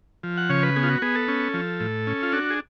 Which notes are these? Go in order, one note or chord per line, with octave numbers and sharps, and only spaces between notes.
F3
F#5
C#3 C#5
B4
B3 G#4
F4
F#4
B3 G#4
A4
C#4
F3
A2
C#4
F4
D4 F#4
G#4